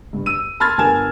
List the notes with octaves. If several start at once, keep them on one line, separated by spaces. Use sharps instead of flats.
G2
E6 D#7
A5 B5 C6 F6 G#6 A6
G1 A#4 G#5 A5 G#6 E7